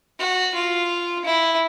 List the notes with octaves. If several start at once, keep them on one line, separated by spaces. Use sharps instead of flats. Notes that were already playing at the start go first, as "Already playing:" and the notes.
F#4
F4
E4